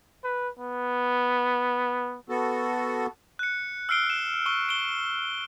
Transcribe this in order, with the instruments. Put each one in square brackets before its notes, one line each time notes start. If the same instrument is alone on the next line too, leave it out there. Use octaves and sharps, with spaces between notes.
[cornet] B4
B3
[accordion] B3 F#4 A4
[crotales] F#6 C#7
E6 F6 C7 D7 G7
E7
C#6 G7
D7 G7